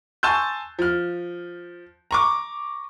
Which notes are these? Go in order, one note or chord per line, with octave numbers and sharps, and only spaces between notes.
G#5 A5 C6 C#6 E6 G6
F3 F6
A#5 C#6 D6